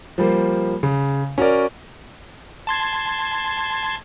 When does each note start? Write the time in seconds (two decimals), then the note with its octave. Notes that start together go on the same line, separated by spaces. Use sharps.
0.18 F3 G3 A#3 C5
0.83 C#3
1.38 C#4 F#4 A#4 D5
2.67 A5 C6 G#6